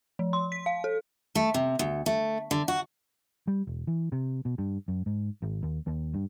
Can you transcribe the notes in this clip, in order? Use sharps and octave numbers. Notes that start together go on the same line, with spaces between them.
F3
C6
B6
F5
A4
A3
C3
D2
A3
D3
F#4
G3
E1
E3
C3
B2
G2
F#2
G#2
G#1
D#2
D#2
G2